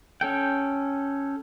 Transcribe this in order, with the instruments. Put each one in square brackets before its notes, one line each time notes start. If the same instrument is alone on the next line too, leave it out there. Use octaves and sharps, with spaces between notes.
[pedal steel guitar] C#4 A4 G5